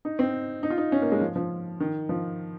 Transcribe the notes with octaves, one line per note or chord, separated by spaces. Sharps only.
D#4
C4
D#4
F4
D#4
C#4
A#3
G#3
F3
F3
D#3
F3